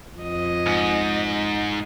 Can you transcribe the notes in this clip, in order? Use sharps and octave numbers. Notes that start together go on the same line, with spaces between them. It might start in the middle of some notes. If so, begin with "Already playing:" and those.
F2 D#5
G#2
D#5